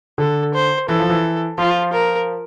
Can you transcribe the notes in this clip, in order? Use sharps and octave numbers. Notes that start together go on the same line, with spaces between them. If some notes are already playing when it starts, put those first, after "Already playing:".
D3 A4
C5
E3 A4
F3
E3
F3 F4
A#4